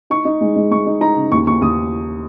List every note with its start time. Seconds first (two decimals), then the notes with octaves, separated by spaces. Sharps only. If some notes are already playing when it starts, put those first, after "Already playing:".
0.10 D#4 C#6
0.25 D#4
0.41 G#3
0.56 G#3
0.71 G#3 C#6
0.86 D#4
1.01 D#4 A#5
1.16 C#3
1.32 D#2 C#6
1.47 D#2 C#6
1.61 D#2 D#6